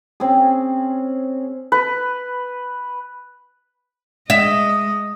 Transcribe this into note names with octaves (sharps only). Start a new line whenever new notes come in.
C4 C#4 G#4
B4
G#3 D#5 E5